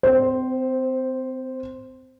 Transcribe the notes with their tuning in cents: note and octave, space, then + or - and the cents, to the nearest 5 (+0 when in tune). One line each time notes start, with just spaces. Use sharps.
C4 -30 C5 +0